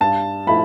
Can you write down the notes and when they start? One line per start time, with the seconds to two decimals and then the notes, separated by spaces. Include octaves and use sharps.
0.01 G2 A5
0.47 F3 A3 E4 B5